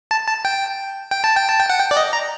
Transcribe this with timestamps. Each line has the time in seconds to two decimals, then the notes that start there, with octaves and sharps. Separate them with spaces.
0.11 A5
0.28 A5
0.45 G5
1.11 G5
1.24 A5
1.36 G5
1.48 A5
1.60 G5
1.70 F#5
1.80 G5
1.91 D5
1.97 D#5
2.13 A#5